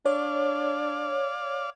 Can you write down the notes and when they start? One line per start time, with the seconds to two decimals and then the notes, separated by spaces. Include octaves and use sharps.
0.06 D4 C#5 D5 F5